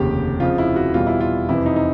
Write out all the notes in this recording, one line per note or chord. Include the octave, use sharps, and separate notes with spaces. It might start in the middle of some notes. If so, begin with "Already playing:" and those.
Already playing: F1 D#2 C#3 G4
F2 C#3 F3 F4
E4
F#4
E2 B2 G3 F4
E4
F4
F2 C3 E3 E4
D#4
D#4